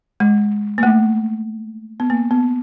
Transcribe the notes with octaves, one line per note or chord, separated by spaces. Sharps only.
G#3
A#3
A3
B3
A#3
B3